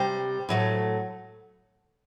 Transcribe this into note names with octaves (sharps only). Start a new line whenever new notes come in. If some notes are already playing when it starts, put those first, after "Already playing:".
Already playing: C3 G3 C5
A2 F#3 A3